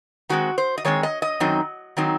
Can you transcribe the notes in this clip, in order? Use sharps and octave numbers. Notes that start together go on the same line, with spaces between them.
D#3 G#3 C4 F#4
C5
D#5
D#3 G#3 C4 C#5
D#5
D#5
F#2 D#3 F#3 C4 D#4
D#3 F#3 C4 D#4